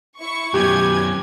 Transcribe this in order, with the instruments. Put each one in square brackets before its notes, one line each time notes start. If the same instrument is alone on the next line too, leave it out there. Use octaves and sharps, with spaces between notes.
[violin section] E4 C#6
[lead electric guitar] F#2 B3 [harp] G4 [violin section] G#5 G#6